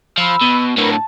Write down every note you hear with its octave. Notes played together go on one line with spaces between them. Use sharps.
F3 B5 E6
B2
A2 D3 A#4 B4
A5